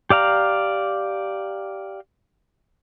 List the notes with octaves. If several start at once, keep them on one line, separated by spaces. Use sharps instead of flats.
G4 D5 F5 A#5